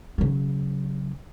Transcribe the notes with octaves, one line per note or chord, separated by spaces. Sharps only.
C#3 F#3